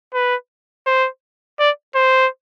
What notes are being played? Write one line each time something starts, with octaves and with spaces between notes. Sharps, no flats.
B4
C5
D5
C5